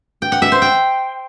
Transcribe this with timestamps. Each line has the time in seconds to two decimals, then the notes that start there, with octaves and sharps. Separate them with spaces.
0.22 G5
0.32 F#5
0.42 E5
0.52 C5
0.62 G5